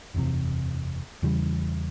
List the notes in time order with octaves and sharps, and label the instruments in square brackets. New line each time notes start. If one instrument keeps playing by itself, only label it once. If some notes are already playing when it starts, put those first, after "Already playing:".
[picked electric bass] F#1 E2 C3
E2 C#3 E3 G3